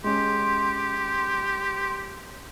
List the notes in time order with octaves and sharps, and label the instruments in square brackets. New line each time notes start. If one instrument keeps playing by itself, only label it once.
[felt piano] G#3 C#4 [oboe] G4 [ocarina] C6